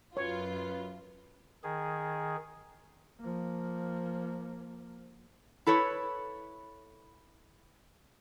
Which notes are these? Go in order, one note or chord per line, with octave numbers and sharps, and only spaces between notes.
F#2 F4 B4 C#5
D#3 G#4
F3 A#3
E4 A4 B4 C#5